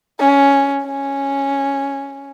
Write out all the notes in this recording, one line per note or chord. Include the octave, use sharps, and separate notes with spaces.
C#4
C#4